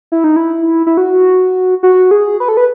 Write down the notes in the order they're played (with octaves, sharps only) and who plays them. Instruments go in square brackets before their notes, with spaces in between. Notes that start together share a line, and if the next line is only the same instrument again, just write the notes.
[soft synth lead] E4
D#4
E4
E4
F#4
F#4
G#4
B4
A4
B4